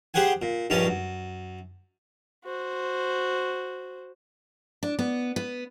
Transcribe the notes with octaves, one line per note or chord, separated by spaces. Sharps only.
G4 G#4 C5 F#5 G#5
A#2
A#1 G2 C#4 D#4 A5
F#2
F#4 C5
D4
B3
B3